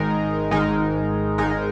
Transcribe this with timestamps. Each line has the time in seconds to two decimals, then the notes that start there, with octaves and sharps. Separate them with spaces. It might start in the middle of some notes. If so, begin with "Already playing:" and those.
Already playing: G#1 G#2 D#3 G#3 D#4 A#4
0.51 G#1 G#2 D#3 G#3 D#4 A#4
1.38 G#1 G#2 G#3 D#4 A#4